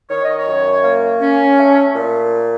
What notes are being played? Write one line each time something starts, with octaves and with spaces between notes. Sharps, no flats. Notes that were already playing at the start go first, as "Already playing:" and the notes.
D#3 C#5
D#5
C#5
F#2
A#3
C#4
A3
A#2